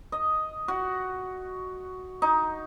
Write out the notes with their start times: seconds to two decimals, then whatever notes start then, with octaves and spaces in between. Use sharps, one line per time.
0.12 D#5
0.68 F#4
2.22 D#4